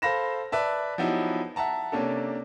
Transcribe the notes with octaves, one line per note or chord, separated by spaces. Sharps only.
A4 C5 F5 B5 A#6 E7
B4 D5 E5 A5
F3 F#3 B3 D#4 E4 G4
E5 F#5 A5 A#5
C3 A#3 C#4 D4 A4